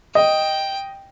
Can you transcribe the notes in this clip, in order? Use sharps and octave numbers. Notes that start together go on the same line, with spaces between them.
D#5 G5